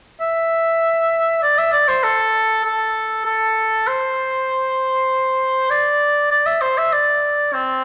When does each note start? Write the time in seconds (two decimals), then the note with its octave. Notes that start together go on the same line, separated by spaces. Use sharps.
0.21 E5
1.43 D5
1.59 E5
1.73 D5
1.88 C5
2.04 A4
2.65 A4
3.26 A4
3.88 C5
5.70 D5
6.32 D5
6.47 E5
6.61 C5
6.78 E5
6.93 D5
7.54 C4